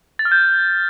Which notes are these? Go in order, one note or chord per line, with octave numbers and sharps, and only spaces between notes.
A6
F6
G6